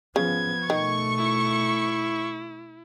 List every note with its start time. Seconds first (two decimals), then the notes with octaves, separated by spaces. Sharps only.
0.16 C#3 F3 B3 G#6
0.70 B2 D#3 A3 C#6
1.18 E4